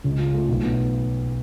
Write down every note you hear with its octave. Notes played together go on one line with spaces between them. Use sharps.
C#2
F4
A3
B1
B3